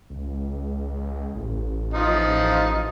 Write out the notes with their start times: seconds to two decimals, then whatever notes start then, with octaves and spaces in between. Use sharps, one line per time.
0.10 C#2
1.35 A1
1.94 F3 D#4 F4